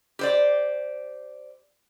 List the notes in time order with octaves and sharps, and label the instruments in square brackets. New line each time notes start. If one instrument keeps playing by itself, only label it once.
[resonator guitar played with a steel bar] G4 C5 D5